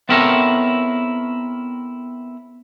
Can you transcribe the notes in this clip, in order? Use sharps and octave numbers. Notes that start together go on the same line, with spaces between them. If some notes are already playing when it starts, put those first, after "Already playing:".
B3 C4 E4 A4 A#4 C#5